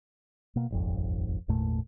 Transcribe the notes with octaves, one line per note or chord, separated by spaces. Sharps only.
B2 A#3
D#1 G#1 F2
G#1 E2 A#2 A3